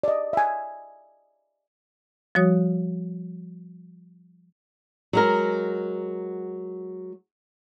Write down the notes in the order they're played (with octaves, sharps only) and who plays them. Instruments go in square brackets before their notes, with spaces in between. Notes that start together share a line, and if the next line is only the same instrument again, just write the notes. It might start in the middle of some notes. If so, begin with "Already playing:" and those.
[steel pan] D5 D#5
E5 G#5
[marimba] F3 G3 F#4 C#5 D#6
[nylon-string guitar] F#3 G#3 A#4